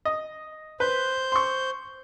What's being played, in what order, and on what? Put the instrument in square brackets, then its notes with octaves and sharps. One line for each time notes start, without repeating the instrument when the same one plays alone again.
[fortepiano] D#5
[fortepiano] B4 [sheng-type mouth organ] C5 G6
[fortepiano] C6 C#6